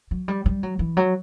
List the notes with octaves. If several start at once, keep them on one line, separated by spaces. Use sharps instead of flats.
F#3
G3
G3
F#3
E3
F#3